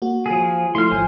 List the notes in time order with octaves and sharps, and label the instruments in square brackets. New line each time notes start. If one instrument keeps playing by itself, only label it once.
[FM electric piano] A#3 F#4
[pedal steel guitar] F3 G#4
[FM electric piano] F3 A3 E4 [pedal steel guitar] C6 F6
[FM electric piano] G#1 G#2 F3 [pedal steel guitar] C5 G#5